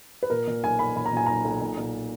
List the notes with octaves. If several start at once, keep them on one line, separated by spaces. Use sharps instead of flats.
B4
A#2 A#4
A#2
B1 G#5
B1 B5
A#2 B5
A#5
A#2 G#5
B1 A#5
B1
A#2
A#2